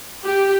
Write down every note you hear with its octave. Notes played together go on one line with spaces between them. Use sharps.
G4